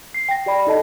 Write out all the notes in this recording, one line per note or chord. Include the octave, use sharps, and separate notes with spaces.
C7
G5 A#6
G4 D5 B5
D#4 A4 D#5 A5